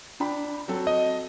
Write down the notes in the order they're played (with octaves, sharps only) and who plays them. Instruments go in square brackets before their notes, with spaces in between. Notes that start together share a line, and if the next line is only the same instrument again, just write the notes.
[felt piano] D4 G5 B5
F#3 C4 A4
[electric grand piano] D#5